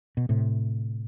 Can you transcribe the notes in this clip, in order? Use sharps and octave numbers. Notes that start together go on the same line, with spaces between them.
B2
A2 C3